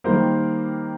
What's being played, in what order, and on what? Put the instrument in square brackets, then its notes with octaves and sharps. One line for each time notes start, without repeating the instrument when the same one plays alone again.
[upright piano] D#3 G3 A#3 A#4 C5